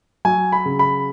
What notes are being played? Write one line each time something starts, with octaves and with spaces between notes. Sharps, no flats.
F#3 G#5
B5
C#3
B5